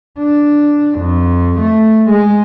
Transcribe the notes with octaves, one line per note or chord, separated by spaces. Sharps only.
D4
F2
A3
G#3